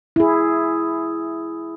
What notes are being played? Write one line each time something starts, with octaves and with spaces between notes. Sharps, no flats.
E4 G#4